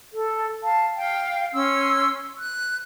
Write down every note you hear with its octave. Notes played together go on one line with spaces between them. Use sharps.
A4
F5 A5
F5 G5
C#4 C6 E6
F#6